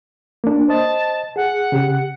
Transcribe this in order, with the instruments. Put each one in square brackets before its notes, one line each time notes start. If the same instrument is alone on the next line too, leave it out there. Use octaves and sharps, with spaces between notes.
[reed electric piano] A#3 D4
[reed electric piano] C5 D#5 [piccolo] A5
[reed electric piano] G#4 [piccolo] F#5
[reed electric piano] C#3 G4